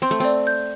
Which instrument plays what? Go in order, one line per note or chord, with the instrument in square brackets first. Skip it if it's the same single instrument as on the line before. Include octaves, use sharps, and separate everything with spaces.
[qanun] C4 [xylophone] C6
[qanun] A3
[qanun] C4 [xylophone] D5
[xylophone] G6